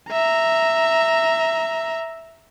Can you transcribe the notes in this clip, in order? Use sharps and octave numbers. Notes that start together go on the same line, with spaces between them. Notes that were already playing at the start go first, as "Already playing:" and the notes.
E5 A#5